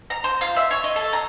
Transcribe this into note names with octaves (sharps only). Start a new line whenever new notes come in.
A#5
C5
F4
E5
C#5
D#5
A4
A#5